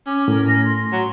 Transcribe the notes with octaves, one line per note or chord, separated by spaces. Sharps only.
C#4 D6
A2 A#4
A#6
C6
F#3